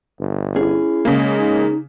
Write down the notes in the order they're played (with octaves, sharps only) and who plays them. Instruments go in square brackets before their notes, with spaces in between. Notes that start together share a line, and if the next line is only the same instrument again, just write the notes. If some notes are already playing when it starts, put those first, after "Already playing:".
[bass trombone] G1
[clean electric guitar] C#4 G#4 [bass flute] E4
[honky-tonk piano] C#3 A#3 [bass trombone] G#3
[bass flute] D#4